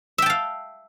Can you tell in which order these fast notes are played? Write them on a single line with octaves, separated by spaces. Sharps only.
E5 G5 A5 F5